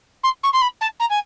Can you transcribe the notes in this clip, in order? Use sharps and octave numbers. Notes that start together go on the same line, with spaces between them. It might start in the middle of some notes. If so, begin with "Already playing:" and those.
C6
C#6
C6
B5
A5
A#5
G#5